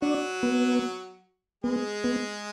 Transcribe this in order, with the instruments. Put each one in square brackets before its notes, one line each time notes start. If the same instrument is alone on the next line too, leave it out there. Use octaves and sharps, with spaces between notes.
[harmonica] F#3 F#4 [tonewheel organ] D4
[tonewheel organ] B3
[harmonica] G#3 G#4 [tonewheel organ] B3
[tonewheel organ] B3